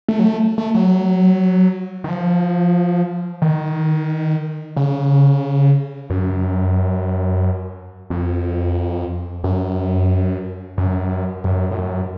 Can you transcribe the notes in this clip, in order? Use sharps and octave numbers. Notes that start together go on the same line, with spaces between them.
A3
F#3
A3
A3
F#3
D#3
F3
D#3
C#3
F#2
F2
F#2
F#2
F#2
A2
F#2